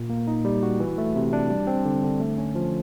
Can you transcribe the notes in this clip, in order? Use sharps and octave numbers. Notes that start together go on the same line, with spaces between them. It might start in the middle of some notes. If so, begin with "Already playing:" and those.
Already playing: A#2
A#3
D#4
G3
F#4
E3
A3
C3
D4
G3
C4
D3
D3
A3
C#4
F3